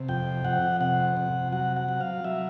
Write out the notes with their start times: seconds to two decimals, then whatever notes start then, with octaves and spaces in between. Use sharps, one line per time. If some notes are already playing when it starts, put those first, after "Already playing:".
Already playing: C3
0.09 F2 G5
0.45 F2 F#5
0.81 C3 F#5
1.17 C3
1.52 F#3 F#5
1.76 F#5
1.89 F#3
2.01 F5
2.24 F#3 E5